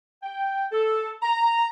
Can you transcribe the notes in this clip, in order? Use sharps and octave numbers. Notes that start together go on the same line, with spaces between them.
G5
A4
A#5